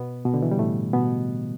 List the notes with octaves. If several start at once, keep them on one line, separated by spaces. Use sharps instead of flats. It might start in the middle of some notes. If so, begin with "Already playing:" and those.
Already playing: B2 B3
B2
D3
E3
G3
A2 A3
B2 B3